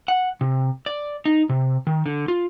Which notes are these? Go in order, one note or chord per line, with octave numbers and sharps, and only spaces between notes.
F#5
C3
D5
D#4
C3
D#3
D3
F4